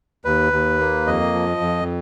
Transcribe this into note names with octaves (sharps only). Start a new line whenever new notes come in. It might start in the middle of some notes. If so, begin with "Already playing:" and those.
D#2 B4
D#2
A#3
F2 D#5
F3
F2